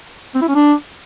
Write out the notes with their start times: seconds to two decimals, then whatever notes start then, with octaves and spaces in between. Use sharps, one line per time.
0.35 C4
0.42 E4
0.48 C#4
0.55 D4